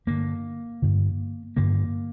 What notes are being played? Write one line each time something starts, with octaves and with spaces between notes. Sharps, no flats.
G2 D3 A#3
G2 D3
G2 D3 A#3